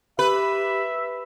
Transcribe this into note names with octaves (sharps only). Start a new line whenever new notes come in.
G4 B4 E5